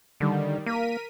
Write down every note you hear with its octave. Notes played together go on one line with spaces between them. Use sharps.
D3 D#3 G3
A#3 A#4 B6 D#7